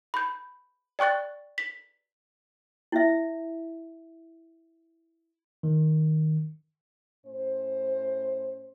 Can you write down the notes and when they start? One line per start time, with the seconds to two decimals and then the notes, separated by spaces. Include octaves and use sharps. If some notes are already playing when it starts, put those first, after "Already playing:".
0.14 B5 G6
0.99 D5 G5 C#6 F#6 A6
1.58 B6
2.92 E4 E5
5.63 D#3
7.26 A2 C#4 C5